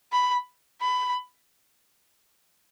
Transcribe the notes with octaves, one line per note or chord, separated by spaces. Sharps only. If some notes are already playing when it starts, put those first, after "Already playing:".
B5
B5